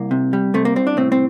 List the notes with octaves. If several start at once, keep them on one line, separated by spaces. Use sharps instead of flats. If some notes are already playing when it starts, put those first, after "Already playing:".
Already playing: C2 A#3
C3
G3
C3 A3
A#3
C2 C4
D4
A2 C4
C4